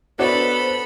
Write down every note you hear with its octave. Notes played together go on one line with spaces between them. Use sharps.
B3 D4 F#4 A4 C5 C#5 B5